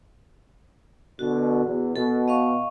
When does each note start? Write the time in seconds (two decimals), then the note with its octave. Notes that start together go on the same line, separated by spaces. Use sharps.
1.19 B2 D3 F#4
1.65 E2
1.96 B2 A4
2.28 D#5 F5 C#6